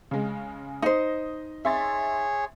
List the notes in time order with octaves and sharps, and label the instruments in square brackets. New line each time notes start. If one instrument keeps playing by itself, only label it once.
[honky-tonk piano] C#3 G#3
[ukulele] D#4 C5 [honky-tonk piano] D#5
[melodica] G#4 C#5 [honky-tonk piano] E5 C6 A6